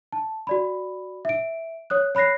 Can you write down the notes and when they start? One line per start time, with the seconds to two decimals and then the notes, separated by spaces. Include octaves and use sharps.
0.13 A5
0.47 F#4 D5 B5
1.25 E5 D7
1.90 C#5 D#6 F#6
2.15 C#5 B5 F#6 A#6 C7